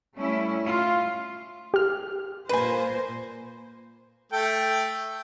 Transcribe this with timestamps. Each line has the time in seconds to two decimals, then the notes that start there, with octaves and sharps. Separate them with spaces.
0.16 G3 A3 C#4 E4
0.65 F4
1.74 G4 F6
2.49 A#2 A#3 B4 C5 G#5
4.32 A3 A4 G5